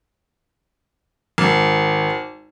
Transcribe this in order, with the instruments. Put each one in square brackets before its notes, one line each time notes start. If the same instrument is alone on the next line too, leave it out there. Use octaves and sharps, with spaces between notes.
[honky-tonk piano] G#1